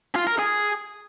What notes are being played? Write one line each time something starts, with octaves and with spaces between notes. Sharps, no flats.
F4
A#4
G#4